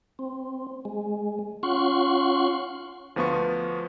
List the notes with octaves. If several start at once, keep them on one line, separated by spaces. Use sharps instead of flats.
C4
G#3
C#4 F4 F#5 C6 C#6
D2 F3 B3 F4 C#6